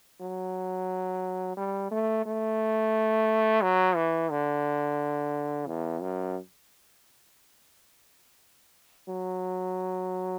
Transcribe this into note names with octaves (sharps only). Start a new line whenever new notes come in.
F#3
G3
A3
A3
F#3
E3
D3
E2
F#2
F#3